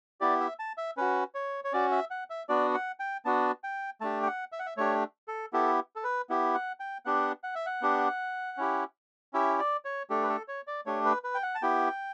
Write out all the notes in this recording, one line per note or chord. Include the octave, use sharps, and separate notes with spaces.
B3 E4 G4 D5
E5
A5
E5
C#4 F#4 B4
C#5
C#5
C#4 F#4 D5
E5
F#5
E5
B3 D4 F#4 D5
F#5
G5
B3 D4 F#4 A5
G5
A3 D4 G4 A5
G5
F#5
E5
F#5
E5
A3 D4 G4 C#5
A4
B3 E4 G4 A4
A4
B4
B3 E4 G4
F#5
G5
B3 D4 G4 F#5
F#5
E5
F#5
B3 D4 G4
C#4 E4 G4
C#4 E4 G4 E5
D5
C#5
A3 D4 G4 A4
B4
A4
C#5
D5
A3 D4 G4 C#5
B4
B4
G5
F#5
A5
B3 E4 G4 G5